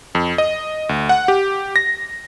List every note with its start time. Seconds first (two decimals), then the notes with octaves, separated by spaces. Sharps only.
0.15 F2
0.38 D#5
0.89 D2
1.09 F#5
1.28 G4
1.76 A#6